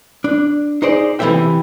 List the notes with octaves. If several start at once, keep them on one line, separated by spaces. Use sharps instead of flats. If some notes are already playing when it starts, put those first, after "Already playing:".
D4
D#4 G#4 C5 D5
C3 E3 B3 A4 E5 G5